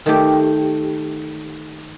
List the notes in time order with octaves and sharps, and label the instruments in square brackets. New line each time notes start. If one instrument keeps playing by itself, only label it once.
[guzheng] D#3 A3 G4